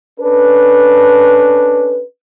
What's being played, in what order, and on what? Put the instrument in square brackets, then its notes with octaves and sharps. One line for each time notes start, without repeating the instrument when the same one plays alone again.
[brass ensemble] C#4 D4 A4 B4